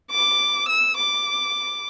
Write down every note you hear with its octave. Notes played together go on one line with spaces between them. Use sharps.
D6
E6
D6